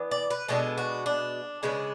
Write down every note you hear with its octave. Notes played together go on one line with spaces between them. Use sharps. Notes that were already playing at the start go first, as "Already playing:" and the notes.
Already playing: E3 B3 D4
D5
B4
B2 G#3 B3 D4 A4
F#4
D4
C#3 G#3 B3 D4